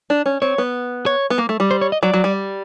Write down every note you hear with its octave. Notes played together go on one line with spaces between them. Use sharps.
D4
C#4
C4 C#5
B3
C#5
B3
A#3
A3
G3
C5
C#5
D#5
F#3 D5
F#3
G3